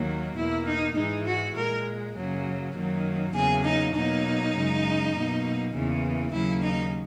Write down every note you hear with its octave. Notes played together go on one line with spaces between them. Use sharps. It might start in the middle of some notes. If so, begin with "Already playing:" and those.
Already playing: D#2 D#3 F#3 A#3
E2 B2 A#3 E4
D#4
G#2 E3 G#3 D#4
F#4
A#2 G#3 A#4
F#2 C#3 F#3 A#3
F#2 D#3 F#3 A#3
E2 C#3 F#3 A#3 G#4
D#4
B2 F#3 A#3 D#4
F#2 C#3 G#3
B2 F#3 A#3
E2 C#3 E3 A#3
D#2 C#3 F#3 A#3 E4
D#4